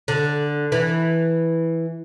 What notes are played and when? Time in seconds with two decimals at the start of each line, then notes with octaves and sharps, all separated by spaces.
0.08 D3
0.72 E3